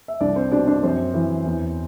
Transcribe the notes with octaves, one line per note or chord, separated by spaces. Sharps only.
E5
C2 D4 D5
C4 C5
B2 D4 D5
D4 D5
F#2 C4 C5
E3
E2